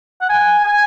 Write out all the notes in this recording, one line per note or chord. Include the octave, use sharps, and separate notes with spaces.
F#5
G#5
G#5